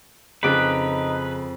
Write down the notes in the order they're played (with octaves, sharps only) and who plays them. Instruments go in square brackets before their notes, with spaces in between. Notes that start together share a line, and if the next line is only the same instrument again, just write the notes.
[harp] F2 D6 F#6 [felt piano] C#3 G#4 D7 [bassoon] D#4 [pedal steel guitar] B4